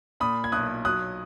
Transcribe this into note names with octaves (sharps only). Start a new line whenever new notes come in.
A#2 B5 D#6
G#6
B1 D#6 F#6
F#3 D#6 F#6